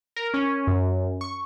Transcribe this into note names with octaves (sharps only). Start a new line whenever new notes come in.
A#4
C#4
F#2
C#6